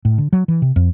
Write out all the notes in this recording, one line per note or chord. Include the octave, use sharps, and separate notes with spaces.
A2
D3
F#3
E3
C3
F2